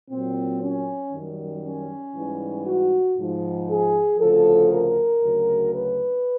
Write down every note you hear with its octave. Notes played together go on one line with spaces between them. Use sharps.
A#2 F#3 C4
C#4
F#2 D#3 G3
C#4
G#2 E3 G3
F#4
G#2 F3
G#4
D2 C#3 F3 A4
A#4
D2 C#3 F#3
B4